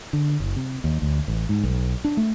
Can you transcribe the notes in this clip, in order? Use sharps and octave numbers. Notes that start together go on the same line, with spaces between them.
D3
F#1
C3
D#2
D2
A1
G#2
B1
D4
A3